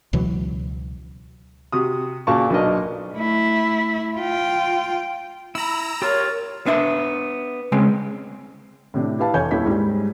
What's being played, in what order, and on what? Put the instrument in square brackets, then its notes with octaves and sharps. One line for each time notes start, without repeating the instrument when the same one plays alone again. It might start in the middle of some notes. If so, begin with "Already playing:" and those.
[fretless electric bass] C#2 B2 E3 F#3
[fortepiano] C3 F#4 D#6
A#2 C#3 F#4 F5 A5 C#6
B1 D4 F#4 A#4 D#5
[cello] A3 E4
F4 G5
[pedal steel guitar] E4 B5 [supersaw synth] A#5 E6
[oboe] F4 [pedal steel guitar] G4 A#4 [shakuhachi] C#5
[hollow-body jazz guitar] B3 D4 E5
C#3 G#3 C4
[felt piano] A2 C3 D4
E4 G4 B4 F5 A5
F1 E3 C#5 G#5 G6 G#6
D#1 A#2 E4 C#5 B6
G#2 G3